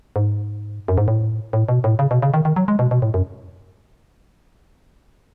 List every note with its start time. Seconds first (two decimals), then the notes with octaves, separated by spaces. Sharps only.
0.16 G#2
0.88 F#2
0.98 G#2
1.08 A2
1.53 A2
1.69 B2
1.84 A2
1.99 C#3
2.11 B2
2.22 C#3
2.34 D#3
2.45 D#3
2.56 F#3
2.68 G#3
2.79 B2
2.91 B2
3.02 A2
3.14 F#2